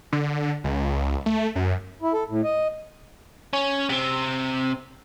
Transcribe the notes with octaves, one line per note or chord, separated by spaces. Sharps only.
D3
C#2
A3
F#2
E4
A4
A2
D#5
C#4
C3 C4